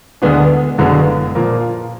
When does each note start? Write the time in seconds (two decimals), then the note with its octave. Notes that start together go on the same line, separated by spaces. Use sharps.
0.22 D2 D3 G#3 B3 D4
0.78 F#1 F#2 D3 G#3 B3
1.35 A#2 F3 A#3 F4